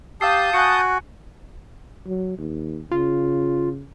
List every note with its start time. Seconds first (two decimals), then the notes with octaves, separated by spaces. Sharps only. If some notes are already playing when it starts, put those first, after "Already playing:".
0.21 G4 F5 A5 D#6 E6 G6 C7
0.53 F#4 G#5 F#6 C#7
2.07 F#3
2.38 D#2
2.92 C#3 F4